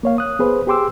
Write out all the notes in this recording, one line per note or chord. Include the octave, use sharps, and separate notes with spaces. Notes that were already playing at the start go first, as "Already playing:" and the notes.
A#3 C#5 F5
D#6 F#6
B3 G#4 B4 C5
G4 G#4 G5 C6 D6 E6